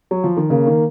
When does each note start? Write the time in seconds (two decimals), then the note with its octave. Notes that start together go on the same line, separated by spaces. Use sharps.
0.11 F#3
0.24 F3
0.37 D#3
0.50 C#3 A#3
0.67 D#3